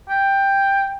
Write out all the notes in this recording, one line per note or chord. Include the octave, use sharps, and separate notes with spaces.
G5